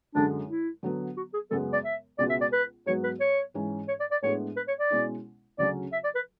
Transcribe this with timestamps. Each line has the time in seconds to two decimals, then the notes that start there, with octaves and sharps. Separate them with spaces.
0.15 F#2 D3 G#3 D4
0.49 E4
0.83 D3 F#3 B3
1.17 F#4
1.34 G#4
1.51 F#2 C#3 G#3 B3 A4
1.73 D5
1.85 E5
2.19 C#2 B2 G#3 B3 F#4 D5
2.30 E5
2.41 D5
2.52 B4
2.86 G#2 F#3 B3 F#4 C#5
3.04 B4
3.20 C#5
3.54 G#2 E3 G#3 C#4
3.88 C#5
4.00 D5
4.11 D5
4.23 A2 G#3 B3 D4 G#4 C#5
4.56 B4
4.68 C#5
4.80 D5
4.91 B2 G#3 C#4 E4
5.58 D2 C#3 F#3 C#4 D5
5.93 E5
6.04 D5
6.15 B4